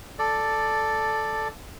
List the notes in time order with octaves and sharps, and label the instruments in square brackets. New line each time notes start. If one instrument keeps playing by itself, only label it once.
[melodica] A4 D5